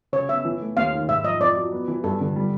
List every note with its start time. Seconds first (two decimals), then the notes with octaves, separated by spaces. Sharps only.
0.13 C#3 C#5
0.29 B3 E5
0.45 E3
0.61 A3
0.76 D#2 F5
0.93 D#3
1.09 G#2 E5
1.24 F3 D#5
1.40 F2 D5
1.57 F#3
1.72 B3
1.88 E3
2.04 G2 A4
2.21 D3
2.36 G3